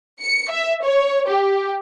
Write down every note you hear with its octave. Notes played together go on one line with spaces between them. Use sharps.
C#7
E5
C#5
G4